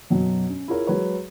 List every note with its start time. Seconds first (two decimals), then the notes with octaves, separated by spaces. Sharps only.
0.10 F#2 B2 F#3
0.49 C#4
0.68 E4 F4 G#4 A#4 C#5
0.87 F#3 G#3 B4 C#5